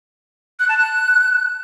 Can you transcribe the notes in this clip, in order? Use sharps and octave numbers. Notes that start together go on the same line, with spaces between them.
F#6
A5
F#6